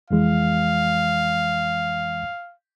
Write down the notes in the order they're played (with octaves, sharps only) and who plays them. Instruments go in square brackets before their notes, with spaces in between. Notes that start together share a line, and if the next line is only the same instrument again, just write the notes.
[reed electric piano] F2 E3 G#3 [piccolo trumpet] F5